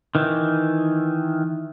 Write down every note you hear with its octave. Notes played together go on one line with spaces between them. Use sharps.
D#3 E3